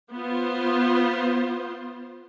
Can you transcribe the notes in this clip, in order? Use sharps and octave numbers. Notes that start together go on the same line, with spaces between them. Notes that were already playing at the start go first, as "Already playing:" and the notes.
B3 F4 C5